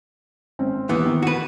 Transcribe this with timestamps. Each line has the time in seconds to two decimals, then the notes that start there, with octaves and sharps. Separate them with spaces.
0.59 G#1 C4 C#4
0.89 D#2 E3 B3
1.06 D#3
1.22 F#4 B4